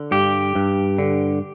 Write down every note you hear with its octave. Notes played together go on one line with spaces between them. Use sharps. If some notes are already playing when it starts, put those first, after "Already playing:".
Already playing: D3
G2 G4
G2
D3